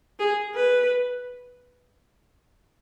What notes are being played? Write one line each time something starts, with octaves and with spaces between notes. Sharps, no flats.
G#4
B4